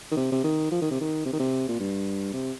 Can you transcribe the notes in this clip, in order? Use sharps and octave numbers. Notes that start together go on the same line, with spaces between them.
D#3
C3
C3
D#3
F3
D#3
C3
D#3
C3
D#3
C3
A#2
G2
C3